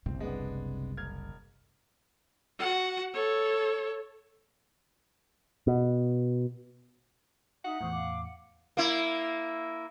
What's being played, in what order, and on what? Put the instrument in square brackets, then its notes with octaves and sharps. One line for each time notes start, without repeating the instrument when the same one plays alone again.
[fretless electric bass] F#1 C2 [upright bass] C3 [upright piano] C4
[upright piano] G#3 B3 D4
E1 F6 G#6
[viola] F#4 F#5
A4 C#5
[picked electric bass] B2
[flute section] D#4 E5 D#6 [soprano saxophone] F#5
[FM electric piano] E2 A2 [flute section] C5 C#6 D#6
[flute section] F5 D6
F#5
[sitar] A#3 E4